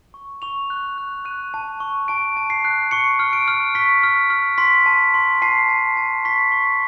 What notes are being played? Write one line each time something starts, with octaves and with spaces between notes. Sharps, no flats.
C#6
C#6 F7
F#6
F#6
F#6 D#7
A5
C#6
A5 D7
A5
C7
F#6
C#6 C#7
F6
D7
F6
C#6 B6
F6
F6
C6 B6
A5
C6
A5 C7
A5
A5
C#6 B6
C#6